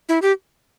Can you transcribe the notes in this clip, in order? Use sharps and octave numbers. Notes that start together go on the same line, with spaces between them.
E4
G4